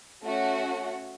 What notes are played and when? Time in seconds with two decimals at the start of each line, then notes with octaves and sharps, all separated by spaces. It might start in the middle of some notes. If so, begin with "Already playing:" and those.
0.23 A3 C#4 F#4